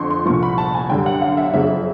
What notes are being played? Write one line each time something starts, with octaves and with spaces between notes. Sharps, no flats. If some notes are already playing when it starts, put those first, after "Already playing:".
Already playing: F2 D3 F3 C6 C#6
C6
C2 A#2 F3 C#6
B5
A5
G#5
F#2 D3 G3 G5
F#5
F5
E5
F2 C#3 F#3 E5